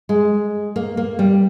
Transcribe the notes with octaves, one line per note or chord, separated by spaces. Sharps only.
G#3
A#3
A#3
G3